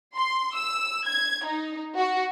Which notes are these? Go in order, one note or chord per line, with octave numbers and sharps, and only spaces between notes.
C6
E6
G#6
D#4
F#4